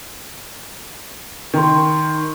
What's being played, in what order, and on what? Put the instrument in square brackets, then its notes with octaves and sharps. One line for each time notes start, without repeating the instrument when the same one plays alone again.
[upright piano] D#3 [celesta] G5 A#5 C6